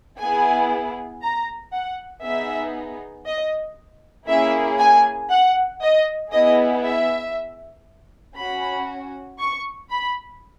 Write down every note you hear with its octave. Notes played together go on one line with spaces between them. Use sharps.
B3 E4 G#4 G#5
A#5
F#5
B3 D#4 G#4 E5
D#5
A#3 C#4 E4 G#4 E5
G#5
F#5
D#5
B3 E4 G#4 D#5
E5
C#4 F#4 B5
C#6
B5